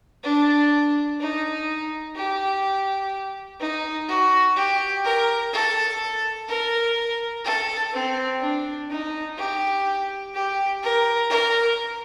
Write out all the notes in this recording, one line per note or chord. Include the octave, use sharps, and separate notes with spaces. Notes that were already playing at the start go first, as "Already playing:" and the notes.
D4
D#4
G4
D#4
F#4
G4
A#4
A4
A#4
A4
C4
D4
D#4
G4
G4
A#4
A#4